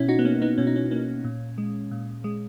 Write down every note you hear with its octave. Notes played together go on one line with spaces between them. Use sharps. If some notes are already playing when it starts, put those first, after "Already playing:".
Already playing: B2 C#4 E4
D#4 F#4
B3
A#3 C#4
B3 D#4
B2 C#4
D#4
C#4
A#3 C#4
A#2
G#3
A#2
G#3